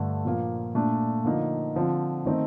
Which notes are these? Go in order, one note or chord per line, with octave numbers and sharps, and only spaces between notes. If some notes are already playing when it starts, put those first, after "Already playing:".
Already playing: G2 D3 A3
A#2 F3 A#3
A#2 A3 D4
D3 F3 A#3 D#4
D3 F3 C4
D#3 A3 C4 D#4